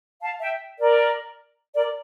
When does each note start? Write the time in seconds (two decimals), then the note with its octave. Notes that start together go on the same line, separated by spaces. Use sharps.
0.22 F5 A5
0.41 E5 G5
0.79 A#4 D5
1.74 A#4 D5